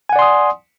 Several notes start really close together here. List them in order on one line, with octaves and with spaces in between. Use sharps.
G#5 F#5 D5 C6 D#6